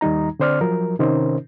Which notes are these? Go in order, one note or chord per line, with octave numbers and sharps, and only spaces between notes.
D#2 D#3 G3 D#4 A#5
D3 C4 C5 D5 F6
F3 F#3 A#4
C3 D#3 C#4 D#4 A#4 C5